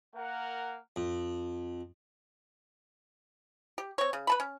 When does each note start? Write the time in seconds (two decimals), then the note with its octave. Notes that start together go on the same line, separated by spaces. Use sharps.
0.15 A#3 A#4 F#5
0.96 F2
3.78 G4
3.98 C4 C#5
4.13 C#3
4.27 B4 A5 B5
4.40 C#4